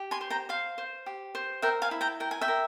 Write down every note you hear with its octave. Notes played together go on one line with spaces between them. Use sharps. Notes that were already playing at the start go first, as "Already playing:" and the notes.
Already playing: G4
G#5 C6
C5
G5 A#5
C5 F5
C5
G4
C5
A#4 E5 G5
F5 G#5
E4
G5 A#5
A#4 G5
G#5
E5 G5
A#4